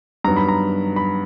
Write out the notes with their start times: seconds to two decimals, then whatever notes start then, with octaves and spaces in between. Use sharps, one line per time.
0.24 G2 D#3 F#3 B3 A#5
0.36 B5
0.48 A#5
0.96 B5